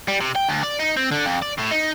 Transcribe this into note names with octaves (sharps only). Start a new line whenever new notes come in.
G3
C3
G5
D2
D5
D#4
C4
D3
F2
D5
A2
D#4